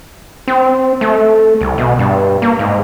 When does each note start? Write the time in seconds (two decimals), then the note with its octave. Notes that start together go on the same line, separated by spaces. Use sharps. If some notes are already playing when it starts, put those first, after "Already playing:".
0.48 C4
1.01 A3
1.61 C2
1.78 B2
1.99 G2
2.42 A#3
2.59 G#2